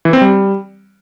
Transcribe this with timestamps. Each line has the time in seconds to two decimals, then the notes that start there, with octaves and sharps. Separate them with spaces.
0.05 E3
0.13 C4
0.21 G3